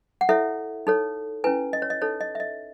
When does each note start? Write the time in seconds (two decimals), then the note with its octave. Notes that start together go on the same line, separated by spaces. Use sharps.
0.21 F#5
0.29 E4 A4 C#5 E5
0.87 D#4 A4 C#5
1.44 C#4 E4 B4 G#5
1.73 D#5
1.82 C#5
1.90 D#5
2.02 D#4 A4 C#5
2.21 D#5
2.35 E5
2.40 D#5